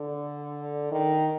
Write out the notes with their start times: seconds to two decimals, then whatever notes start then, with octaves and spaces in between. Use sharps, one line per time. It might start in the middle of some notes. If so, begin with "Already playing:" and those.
Already playing: D3
0.92 D#3